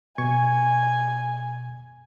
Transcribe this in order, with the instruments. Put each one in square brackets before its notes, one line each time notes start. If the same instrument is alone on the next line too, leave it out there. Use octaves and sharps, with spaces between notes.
[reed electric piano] B2 C#6 G#6 [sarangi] G#5